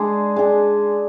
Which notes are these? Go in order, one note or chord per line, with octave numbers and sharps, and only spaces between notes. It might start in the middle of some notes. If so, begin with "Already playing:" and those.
Already playing: G#3 D4 G#4
G#3 D4 G#4